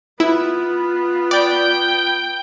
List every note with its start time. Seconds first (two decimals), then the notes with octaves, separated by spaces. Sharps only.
0.20 B3 E4 F4
1.31 D5 G5